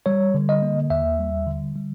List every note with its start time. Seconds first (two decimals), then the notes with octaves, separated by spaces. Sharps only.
0.06 G3 C#5
0.34 D3
0.49 D#5
0.62 A#3
0.90 D#2 E5
1.19 G3
1.47 D3
1.76 G3